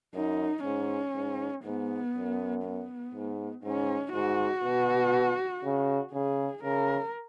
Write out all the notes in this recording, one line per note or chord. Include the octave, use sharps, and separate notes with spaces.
F#2 D#4
G#2 C#4
G#2
G#2 B3
F#2
B3
G#2
G#2 C#4
G#2 F#4
B2
C#3
C#3 G#4
C#3 A#4